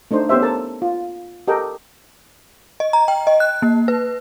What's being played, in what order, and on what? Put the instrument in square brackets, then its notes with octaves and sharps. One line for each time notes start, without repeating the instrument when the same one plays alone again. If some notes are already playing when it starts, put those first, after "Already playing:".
[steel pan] A3 D4 D#4 C5
B3 C#4 G4 C5 E5
A4 A#4 A5
F4
G4 A4 A#4 D#5 G5
[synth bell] D#5
A#5
G5
D#5
F#6
A#3
B4